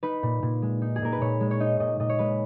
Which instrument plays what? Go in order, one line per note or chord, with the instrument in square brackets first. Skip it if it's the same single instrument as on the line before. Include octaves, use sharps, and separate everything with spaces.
[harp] D#4 B4
A#2
A#2
G#3
D#4
G#4
A#2 A#4
B4
A#2 C#5
G#3
C#5
D#4 D#5
A#2 D#5
A#2 D#5
C#5
G#3 B4